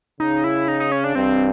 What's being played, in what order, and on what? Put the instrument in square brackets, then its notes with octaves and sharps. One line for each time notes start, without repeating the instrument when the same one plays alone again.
[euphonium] C#3 [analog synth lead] D#4
[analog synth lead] E4
D#4
D#4
C#4
D4
[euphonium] G2 [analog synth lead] C4